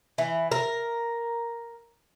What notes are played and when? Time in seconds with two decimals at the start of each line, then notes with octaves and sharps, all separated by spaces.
0.18 E3
0.52 A#4